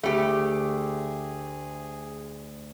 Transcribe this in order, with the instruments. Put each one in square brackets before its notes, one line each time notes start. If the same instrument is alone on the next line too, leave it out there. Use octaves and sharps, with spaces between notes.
[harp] D2 [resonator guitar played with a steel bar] A3 G4 [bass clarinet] G#4